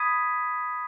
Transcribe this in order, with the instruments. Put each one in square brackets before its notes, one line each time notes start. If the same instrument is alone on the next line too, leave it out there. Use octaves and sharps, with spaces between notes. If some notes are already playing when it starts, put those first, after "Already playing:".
Already playing: [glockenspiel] B5 D#6 G#6 B6 D#7